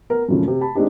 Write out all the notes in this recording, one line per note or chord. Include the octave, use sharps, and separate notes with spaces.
B3 A#4
F#2 A#2 C#3 F3 A3
C3
A5 B5
G#3 C4 D4 D#4 G4